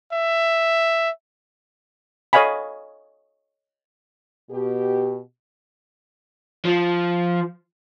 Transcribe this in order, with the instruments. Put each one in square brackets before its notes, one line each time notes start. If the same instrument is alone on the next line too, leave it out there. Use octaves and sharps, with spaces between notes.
[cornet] E5
[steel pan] A4 C#5 D#5 F5 G#5 B5
[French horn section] B2 G4
[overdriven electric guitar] F3